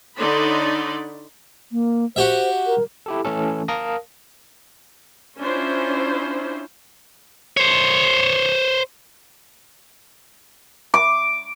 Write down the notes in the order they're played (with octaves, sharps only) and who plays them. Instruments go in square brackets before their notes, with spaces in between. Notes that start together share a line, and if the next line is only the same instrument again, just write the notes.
[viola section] D3 D#4 C#5 D5 B5 C6
[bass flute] A#3
[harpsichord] F#4 G4 E5 [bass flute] C5
[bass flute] A#4
[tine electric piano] E4 G4 A4
E3 A3 C#4 A4
A#4 F5 A5 D#6 A#6
[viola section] C#4 D4 E4 F4 C5
[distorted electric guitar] C5 C#5
[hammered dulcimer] D6